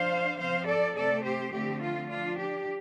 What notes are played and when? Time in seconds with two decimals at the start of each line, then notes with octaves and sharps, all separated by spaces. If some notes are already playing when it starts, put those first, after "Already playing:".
Already playing: F3 D4 C5 F5
0.39 F3 C4 C5 F5
0.67 A4 D5
0.96 C3 A3 C4 A4 D5
1.24 G4 C5
1.53 D3 F3 A3 C4 G4
1.82 F4
2.09 F3 D4 F4
2.38 G4